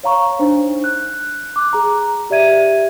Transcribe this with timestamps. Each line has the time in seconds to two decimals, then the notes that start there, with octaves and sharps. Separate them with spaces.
0.03 C#5 F5 A#5 C#6
0.39 D4 D#4 C5
0.84 F#6
1.56 D6 F#6
1.73 G#4 A#5
2.30 G4 D5 E5 G#6 D#7